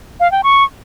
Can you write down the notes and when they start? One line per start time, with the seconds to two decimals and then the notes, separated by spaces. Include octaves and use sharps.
0.20 F5
0.32 G5
0.44 C#6